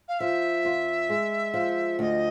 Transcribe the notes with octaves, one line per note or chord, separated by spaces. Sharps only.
F5
F3 E5
F2
G#3
F3
D2 D#5 E5